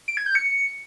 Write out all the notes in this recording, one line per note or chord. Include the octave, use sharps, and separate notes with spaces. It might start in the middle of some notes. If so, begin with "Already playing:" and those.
D7
G#6
G6
C#7